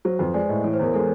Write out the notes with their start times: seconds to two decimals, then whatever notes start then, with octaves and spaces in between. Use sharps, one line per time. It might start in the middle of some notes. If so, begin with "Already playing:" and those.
0.05 F#3 C5
0.19 F2 B4
0.34 G#3 D5
0.49 A2 D#5
0.64 E3 C#5
0.74 C5
0.79 E2 A#4
0.94 G#3 A4